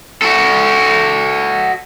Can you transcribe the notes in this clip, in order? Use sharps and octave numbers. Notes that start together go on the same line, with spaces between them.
F#4 A4